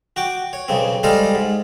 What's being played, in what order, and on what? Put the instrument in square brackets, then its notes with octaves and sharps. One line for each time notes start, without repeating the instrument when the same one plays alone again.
[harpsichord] F#4 G5 D6
C#5
B1 C#3 C4
G3 G#3 A4 C5 F5 A#5
G#2